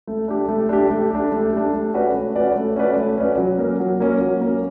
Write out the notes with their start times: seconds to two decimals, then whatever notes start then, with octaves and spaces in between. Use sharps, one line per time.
0.07 A3
0.28 D4 G4
0.48 A3
0.69 D4 G4
0.90 A3
1.10 D4 G4
1.32 A3
1.53 D4 G4
1.73 A3
1.94 C#4 F#4 B4 D5
2.14 A3
2.36 C#4 F#4 B4 D5
2.56 A3
2.76 C#4 F#4 B4 D5
2.96 A3
3.18 C#4 F#4 B4 D5
3.38 F#3
3.58 A#3 C#4
3.80 F#3
4.00 A#3 C#4
4.21 F#3
4.41 A#3 C#4